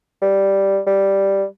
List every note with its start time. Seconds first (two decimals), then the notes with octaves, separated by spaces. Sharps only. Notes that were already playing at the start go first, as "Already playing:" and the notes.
0.22 G3
0.87 G3